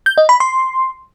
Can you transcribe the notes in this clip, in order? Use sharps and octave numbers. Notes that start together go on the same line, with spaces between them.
G6
D#5
B5
C6